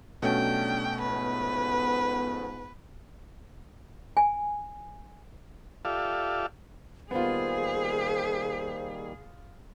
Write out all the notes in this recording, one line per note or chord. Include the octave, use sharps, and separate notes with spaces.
B2 F#3 G3 A3 C#4 D4 G5
G#2 F3 B3 B4
G#5
F4 G4 A4 D5 E5 F5
D#3 G3 A#3 B3 F4 G#4 C5